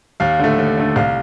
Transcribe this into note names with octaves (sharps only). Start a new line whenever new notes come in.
D#2 F5
D3 A3
D#2
D3 A3
C2 F5